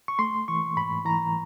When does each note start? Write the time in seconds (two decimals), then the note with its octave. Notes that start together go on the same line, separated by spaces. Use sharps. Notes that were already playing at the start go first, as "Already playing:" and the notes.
0.08 C#6
0.19 A3 C6
0.48 E3 C#6
0.76 G#2 B5
1.05 E3 A#5